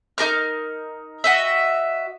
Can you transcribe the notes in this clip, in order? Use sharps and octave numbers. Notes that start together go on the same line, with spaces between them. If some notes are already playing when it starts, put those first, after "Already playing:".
D#4 G4 A#4 F6
F#4 D#5 E5